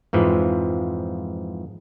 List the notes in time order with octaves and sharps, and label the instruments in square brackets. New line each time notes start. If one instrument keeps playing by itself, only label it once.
[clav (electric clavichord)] F2 G#2 E3 F3